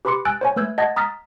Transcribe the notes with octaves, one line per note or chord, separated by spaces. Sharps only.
G4 B4 B5 C6 D6 C#7
G#5 E6 F#6 A6 D7
C5 C#5 G#5
A3 B4 E6 G6 G#6
D#5 F#5 A5 G#6 A6
A#5 D#6 F6 A6 B6